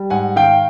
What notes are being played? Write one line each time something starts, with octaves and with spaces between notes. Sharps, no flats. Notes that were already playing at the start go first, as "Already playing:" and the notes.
Already playing: G3
G#2 F#5 G#5
D#3 F5 G5